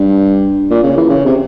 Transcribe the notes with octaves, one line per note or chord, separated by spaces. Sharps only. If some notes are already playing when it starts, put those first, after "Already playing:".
Already playing: G2
A#2
C#3
E3
C#3
C3